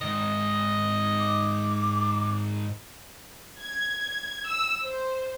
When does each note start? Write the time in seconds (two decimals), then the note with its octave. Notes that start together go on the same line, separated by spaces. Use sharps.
0.01 G#2 D#3 D#5
1.19 D6
3.61 G#6
4.47 E6
4.85 C5